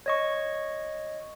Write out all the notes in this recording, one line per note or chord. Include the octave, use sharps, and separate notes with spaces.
C#5 D#5 C#6